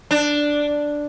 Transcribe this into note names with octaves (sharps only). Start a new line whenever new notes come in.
D4